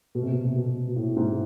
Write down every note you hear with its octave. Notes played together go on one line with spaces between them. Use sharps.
B2
C3
B2
C3
B2
B2
A2
G#2